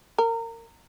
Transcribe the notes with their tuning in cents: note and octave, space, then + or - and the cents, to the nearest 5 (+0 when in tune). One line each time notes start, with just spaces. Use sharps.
A#4 -25